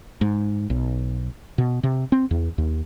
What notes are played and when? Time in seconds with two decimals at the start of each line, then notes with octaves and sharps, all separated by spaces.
0.21 G#2
0.70 B1
1.58 B2
1.83 C3
2.12 C4
2.31 E2
2.58 D#2